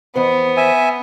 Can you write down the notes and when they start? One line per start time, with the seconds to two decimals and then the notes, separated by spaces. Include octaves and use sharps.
0.16 F2 E3 B3 C5
0.57 E5 G#5